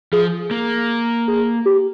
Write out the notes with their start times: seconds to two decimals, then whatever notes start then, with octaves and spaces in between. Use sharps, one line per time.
0.13 F3 G#4
0.51 A#3
1.28 G#4
1.66 G4